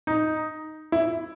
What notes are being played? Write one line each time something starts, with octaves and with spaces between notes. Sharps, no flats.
D#4
E4